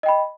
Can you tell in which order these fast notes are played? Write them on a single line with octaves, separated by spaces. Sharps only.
D#5 G5 B5